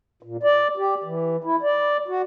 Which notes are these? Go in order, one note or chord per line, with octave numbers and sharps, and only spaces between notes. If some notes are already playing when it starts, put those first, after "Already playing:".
A#2
D5
G4
E3
E4
D5
F#4